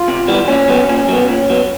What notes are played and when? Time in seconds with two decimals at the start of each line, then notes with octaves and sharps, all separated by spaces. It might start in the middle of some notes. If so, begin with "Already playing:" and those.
Already playing: F4
0.08 C3
0.28 E3 G3 B3
0.48 A#2 C#4
0.68 F#3 B3
0.89 A#2 C#4
1.08 F#3 B3
1.29 A#2
1.50 F#3 B3